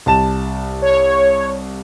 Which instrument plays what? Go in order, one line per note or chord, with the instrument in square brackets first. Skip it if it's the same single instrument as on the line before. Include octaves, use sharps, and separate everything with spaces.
[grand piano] C2 A5 E7
[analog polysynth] C#5